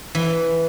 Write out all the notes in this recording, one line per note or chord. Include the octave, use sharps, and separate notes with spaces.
E3